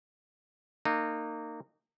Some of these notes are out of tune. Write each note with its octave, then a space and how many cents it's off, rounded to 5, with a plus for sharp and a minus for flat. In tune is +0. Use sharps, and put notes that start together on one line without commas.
A#3 -25 D#4 -25